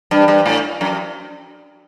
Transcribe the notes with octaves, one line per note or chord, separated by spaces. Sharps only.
G2
G2
A2
F#2